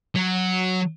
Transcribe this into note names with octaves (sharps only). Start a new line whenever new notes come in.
F#3